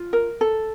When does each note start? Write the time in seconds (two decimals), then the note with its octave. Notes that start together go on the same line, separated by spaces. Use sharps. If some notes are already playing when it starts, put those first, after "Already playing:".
Already playing: F4
0.13 A#4
0.41 A4